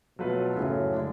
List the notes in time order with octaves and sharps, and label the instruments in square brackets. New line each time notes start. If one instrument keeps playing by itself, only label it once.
[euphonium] B2 [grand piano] F#3 A3 F4 B4
[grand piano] F#2 C#3 F#3 [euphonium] A2
[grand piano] D3 G#3 D4